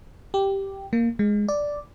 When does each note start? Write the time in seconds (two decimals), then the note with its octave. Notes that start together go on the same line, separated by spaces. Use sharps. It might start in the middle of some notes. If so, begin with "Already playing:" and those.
0.34 G4
0.93 A#3
1.19 G#3
1.48 D5